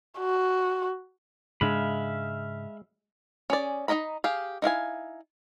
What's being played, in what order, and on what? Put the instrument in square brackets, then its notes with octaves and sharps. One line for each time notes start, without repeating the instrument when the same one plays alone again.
[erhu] F#4
[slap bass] G#2 C#3 D4 [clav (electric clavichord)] G#3 [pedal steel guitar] E5 F5 B5
[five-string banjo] C#4 G#4 D5
D#4 E4 D#5 A#5 B5
G4 G#4 F5
D#4 E4 F5 G#5